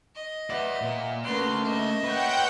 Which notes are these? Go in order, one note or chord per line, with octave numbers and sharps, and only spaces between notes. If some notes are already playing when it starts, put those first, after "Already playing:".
D#5
B4 D5 E5 F#5
A#2
A3 A#3 C#4 A#4 B4 F#5 C6
D#5 E5
B4 C#5 F#5 G5 G6